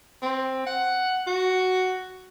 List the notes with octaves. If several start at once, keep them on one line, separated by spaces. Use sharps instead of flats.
C4
F#5
F#4